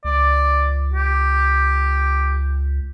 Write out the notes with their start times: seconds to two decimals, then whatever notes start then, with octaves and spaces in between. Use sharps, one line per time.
0.05 C#2 D5
0.94 G4